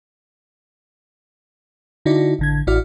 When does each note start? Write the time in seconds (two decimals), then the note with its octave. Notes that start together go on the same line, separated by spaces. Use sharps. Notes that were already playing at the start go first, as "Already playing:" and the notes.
2.06 D3 D#4 E4 F#4 D5
2.39 A1 D3 G#6
2.67 A1 E4 F#4 D5 F6